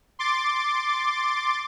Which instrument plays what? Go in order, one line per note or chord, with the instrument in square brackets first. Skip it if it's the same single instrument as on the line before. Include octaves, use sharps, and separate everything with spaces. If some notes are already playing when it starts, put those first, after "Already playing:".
[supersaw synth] C6 D6 A6